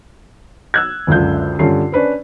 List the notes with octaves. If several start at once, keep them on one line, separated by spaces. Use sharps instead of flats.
E6 F#6 G#6
F#1 C#2 F#2 D3 F4 G6
G2 D3 C#4 F4 C7
C#4 D4 B4 C5